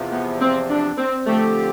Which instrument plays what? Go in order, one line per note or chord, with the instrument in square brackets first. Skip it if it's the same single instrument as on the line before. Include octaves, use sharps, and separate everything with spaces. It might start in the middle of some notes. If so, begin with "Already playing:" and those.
Already playing: [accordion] E2 C3 F3
[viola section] B3
C4
D4
C4
[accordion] D3 F3 C4 G4 [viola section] A3